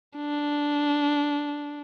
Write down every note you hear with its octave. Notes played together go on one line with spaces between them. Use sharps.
D4